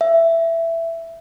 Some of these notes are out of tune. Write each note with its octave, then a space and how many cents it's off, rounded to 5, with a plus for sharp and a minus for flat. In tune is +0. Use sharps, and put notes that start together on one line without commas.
E5 +10